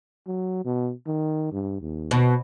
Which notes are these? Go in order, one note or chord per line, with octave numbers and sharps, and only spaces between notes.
F#3
B2
D#3
G2
D#2
B2